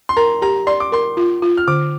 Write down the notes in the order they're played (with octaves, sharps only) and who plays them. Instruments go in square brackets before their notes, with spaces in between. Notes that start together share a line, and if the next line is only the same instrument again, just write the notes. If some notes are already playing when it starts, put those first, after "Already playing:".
[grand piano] C6
[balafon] A#4 [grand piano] A#5
[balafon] G4 [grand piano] A#5
[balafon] D5 [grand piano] C6
[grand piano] D6
[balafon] A#4 [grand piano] C6
[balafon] F4
F4
[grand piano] F6
[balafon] D3 [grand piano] D6